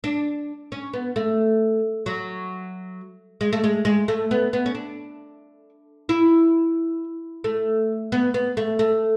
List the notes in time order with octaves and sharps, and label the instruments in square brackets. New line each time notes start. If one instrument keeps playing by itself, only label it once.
[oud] D4
C#4
B3
A3
F#3
G#3
A3
G#3
G#3
A3
B3
B3
C#4
D4
E4
A3
B3
B3
A3
A3